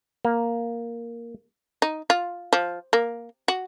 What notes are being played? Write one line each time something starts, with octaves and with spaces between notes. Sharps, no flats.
A#3
D#4
F4
F3
A#3
F#4